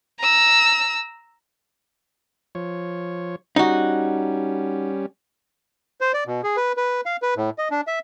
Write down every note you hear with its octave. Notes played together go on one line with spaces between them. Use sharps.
A#5 E6
F3 C#5
G3 C#4 D#4 F#4
C5
D5
B2
G#4
B4
B4
F5
B4
A2
D#5
D4
E5